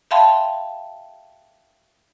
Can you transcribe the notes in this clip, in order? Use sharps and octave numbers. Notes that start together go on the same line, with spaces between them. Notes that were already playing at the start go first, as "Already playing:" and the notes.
E5 F5 G5 A5 B5 C6